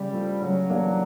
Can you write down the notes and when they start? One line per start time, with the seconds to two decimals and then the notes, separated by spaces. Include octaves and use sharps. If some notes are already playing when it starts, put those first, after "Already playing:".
Already playing: C#3 G3
0.13 F3 A3
0.41 C#3 F#3
0.70 E3 G3 A#3 D4